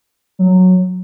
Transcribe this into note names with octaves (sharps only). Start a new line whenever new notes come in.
F#3